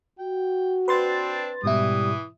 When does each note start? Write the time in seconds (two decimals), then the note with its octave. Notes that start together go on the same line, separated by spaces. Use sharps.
0.19 F#4 G5
0.88 C4 D4 B4 C6 A6
1.63 G#2 B2 E3 G3 E4 D#6